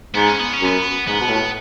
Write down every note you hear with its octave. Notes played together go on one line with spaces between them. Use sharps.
G#2 B3
C#4
B3
C#4
F#2 B3
G#2 B3
B2
A2